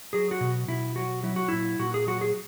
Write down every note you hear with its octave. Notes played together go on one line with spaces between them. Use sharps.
F#3 G#4
F#4
B2
B2 E4
F#3 F#4
F#3 E4
F#4
A#2 E4
A#2 F#4
G#4
F#3 F#4
G#4